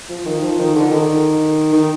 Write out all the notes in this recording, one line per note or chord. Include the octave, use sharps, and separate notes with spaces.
F3
D#3
F3
D#3
D3
D#3
D#3